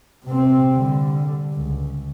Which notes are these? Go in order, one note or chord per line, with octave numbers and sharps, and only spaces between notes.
C3 C4
D3 G3
C#2